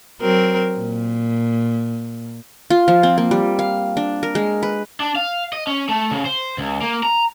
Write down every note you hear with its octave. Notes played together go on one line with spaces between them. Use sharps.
F#3 C4 A#4
A#2
F4
F3
C4
A#3
G3
F5
D4
A#4
G#3
B4
D4
F5
D#5
C#4
A3
C#3
C5
C#2
A#3
A#5